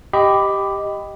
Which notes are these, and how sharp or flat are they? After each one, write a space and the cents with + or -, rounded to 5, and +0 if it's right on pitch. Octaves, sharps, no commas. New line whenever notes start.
G4 +0 D#5 +0 B5 +15